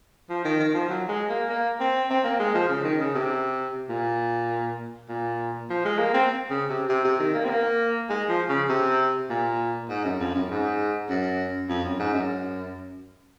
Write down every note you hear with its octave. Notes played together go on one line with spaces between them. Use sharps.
F3
D#3
D#3
F3
F#3
G#3
A#3
A#3
C4
C4
A#3
G#3
F3
C#3
D#3
C#3
C3
A#2
A#2
F3
G#3
A#3
C4
C#3
C3
C3
C3
D#3
A#3
C4
A#3
G#3
F3
C#3
C3
A#2
G#2
F#2
F2
F#2
G#2
F#2
F2
F#2
G#2
F#2